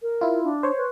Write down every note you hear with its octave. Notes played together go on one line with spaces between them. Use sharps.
A#4
E4 F4
D4
C5 C#5
B4